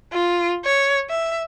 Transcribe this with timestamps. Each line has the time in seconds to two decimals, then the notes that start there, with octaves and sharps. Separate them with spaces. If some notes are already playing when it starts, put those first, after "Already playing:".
0.12 F4
0.65 C#5
1.10 E5